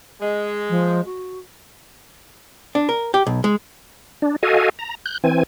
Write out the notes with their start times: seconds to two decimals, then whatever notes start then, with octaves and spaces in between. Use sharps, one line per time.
0.21 G#3
0.69 F3
1.05 F#4
2.75 D4
2.89 A#4
3.14 G4
3.27 B1
3.44 G#3
4.22 D4
4.43 F#4 A4 D#5 F5 G#5
4.79 A#5
5.06 F#6 G6
5.24 E3 C4 G#5